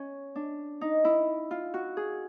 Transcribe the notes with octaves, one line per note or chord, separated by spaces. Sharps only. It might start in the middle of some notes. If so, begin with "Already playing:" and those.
Already playing: C#4
D4
D#4
E4
F4
F#4
G#4